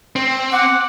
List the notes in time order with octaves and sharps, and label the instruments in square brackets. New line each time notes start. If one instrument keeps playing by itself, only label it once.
[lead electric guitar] C4
[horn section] F#5 [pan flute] D6